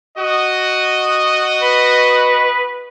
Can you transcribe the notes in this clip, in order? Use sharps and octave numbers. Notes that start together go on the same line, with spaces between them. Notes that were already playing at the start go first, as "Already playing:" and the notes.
F#4 D#5
B4